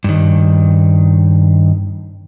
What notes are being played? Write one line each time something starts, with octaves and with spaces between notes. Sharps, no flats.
G2 D#3